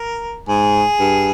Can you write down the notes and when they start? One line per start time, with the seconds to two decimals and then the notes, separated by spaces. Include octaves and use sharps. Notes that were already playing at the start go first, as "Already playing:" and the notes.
Already playing: A#4
0.48 G#2 G#4
1.00 G2